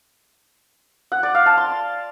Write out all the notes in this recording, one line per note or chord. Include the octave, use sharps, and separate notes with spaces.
F#5
D5
F5
A5
C6